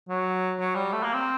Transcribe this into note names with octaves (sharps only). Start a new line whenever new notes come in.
F#3
F#3
G3
A3
A#3
C4